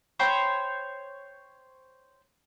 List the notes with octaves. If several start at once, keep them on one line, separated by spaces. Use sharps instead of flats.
C5 C#5 G5 B5